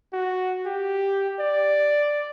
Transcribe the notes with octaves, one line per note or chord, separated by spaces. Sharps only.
F#4
G4
D5